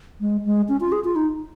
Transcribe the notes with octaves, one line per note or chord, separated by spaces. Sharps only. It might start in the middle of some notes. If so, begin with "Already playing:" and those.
G#3
G#3
C#4
F4
G#4
F4
D#4